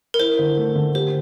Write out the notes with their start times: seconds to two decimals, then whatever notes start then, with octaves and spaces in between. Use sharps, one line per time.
0.14 A#4
0.19 E4 C5
0.39 D3
0.57 A3
0.75 D3
0.95 G4 C5